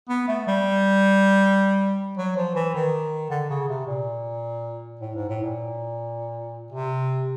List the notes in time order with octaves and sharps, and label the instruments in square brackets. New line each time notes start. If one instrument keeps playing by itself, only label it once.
[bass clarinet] B3
A3
G3
F#3
F3
E3
D#3
D3
C#3
C3
A#2
A2
G#2
A2
A#2
C3